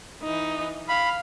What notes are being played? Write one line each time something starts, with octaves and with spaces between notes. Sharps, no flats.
E3 D#4
F5 B5